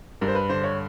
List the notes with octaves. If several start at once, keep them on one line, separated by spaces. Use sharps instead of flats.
G2 A#4
C5
B4
D3 C5
C#5